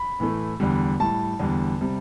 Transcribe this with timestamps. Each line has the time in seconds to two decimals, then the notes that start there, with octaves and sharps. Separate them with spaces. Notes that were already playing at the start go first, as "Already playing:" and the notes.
Already playing: B5
0.20 A2 E3 A3
0.60 E2 D3 G3
1.00 A2 G3 A5
1.40 E2 D3 G3
1.81 C3 G3